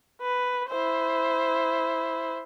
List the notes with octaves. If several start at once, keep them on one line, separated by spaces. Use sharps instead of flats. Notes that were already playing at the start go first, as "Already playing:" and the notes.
B4
E4 C5